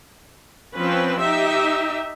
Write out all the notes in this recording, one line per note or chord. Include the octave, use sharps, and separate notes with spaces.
F3 C4 C#4 B4
D#4 G4 E5